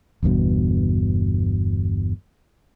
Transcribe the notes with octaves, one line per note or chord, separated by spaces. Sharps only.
G1 E2 G2 B2